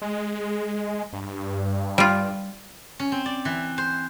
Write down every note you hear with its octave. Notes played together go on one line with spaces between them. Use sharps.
G#3
G2
G3 F4
C#4
C4
D5
E3
C5